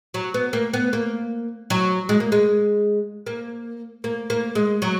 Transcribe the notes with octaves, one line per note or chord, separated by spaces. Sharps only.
F#3
B3
A#3
B3
A#3
F#3
G#3
A#3
G#3
A#3
A#3
A#3
G#3
F#3